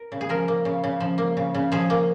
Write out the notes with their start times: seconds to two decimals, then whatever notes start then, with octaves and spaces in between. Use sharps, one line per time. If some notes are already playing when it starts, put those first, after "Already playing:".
Already playing: A#4
0.12 C#3
0.21 G#4
0.29 F3 A#4
0.48 A#3
0.65 C#3
0.84 C#3
1.00 F3
1.18 A#3
1.37 C#3
1.55 C#3
1.72 F3 G#4
1.90 A#3